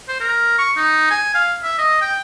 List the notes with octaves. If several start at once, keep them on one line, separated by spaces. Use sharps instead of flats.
C5
A#4
C#6
D#4
G#5
F5
E5
D#5
G5